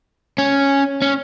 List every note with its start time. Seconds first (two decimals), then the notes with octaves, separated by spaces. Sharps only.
0.38 C#4
1.02 C#4